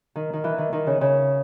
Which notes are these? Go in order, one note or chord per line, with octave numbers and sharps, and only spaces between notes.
D#3
D#3
E3
D#3
D#3
C#3
C#3